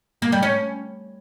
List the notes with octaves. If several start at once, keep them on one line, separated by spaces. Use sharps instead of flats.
A#3
G3
C#4